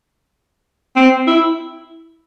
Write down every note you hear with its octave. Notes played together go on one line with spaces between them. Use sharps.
C4
E4